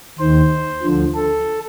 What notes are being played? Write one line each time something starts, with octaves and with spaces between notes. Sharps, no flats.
D#2 D#3 C5
D2 D3 F3
A4